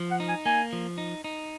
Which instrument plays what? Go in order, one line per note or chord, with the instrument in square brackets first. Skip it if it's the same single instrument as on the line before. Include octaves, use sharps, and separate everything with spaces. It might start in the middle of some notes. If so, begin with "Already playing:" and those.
Already playing: [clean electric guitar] F3
[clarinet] F#5
[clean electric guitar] D#4
[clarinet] G#5
[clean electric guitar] A#3 [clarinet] G#5
[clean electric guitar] F3
D#4
D#4